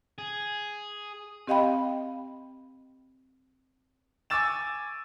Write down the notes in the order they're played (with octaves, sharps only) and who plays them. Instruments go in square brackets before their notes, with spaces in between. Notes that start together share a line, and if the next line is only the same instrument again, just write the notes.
[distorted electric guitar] G#4
[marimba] C4 G4 D#5 F5 G5 B5
[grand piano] G#5 C#6 D6 E6 A6 E7